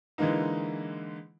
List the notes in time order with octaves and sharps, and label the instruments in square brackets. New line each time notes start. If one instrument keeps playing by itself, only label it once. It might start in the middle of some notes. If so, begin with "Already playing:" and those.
[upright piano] D3 E3 G#3 A#3 D#4